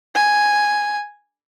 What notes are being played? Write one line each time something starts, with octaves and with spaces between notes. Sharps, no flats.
G#5